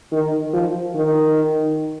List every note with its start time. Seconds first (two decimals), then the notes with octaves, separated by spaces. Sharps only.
0.12 D#3
0.54 F3
0.95 D#3